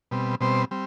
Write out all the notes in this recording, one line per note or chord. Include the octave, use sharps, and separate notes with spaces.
B2 G3 C4
B2 G3 C4 C5
G3 C4